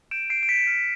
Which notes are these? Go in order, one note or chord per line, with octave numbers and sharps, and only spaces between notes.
G6 D7 E7
G6 C7 D7
D7
G6 B6 C#7
F6